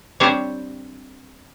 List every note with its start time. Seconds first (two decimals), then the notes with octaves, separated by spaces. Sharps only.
0.20 G3 C4 D4 G4 C5 C#5